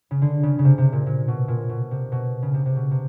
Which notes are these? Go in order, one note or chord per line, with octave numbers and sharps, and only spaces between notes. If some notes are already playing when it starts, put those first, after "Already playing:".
C#3
D3
C#3
C#3
C3
C3
A#2
A#2
B2
A#2
B2
C3
B2
C#3
C3
C3
B2
C3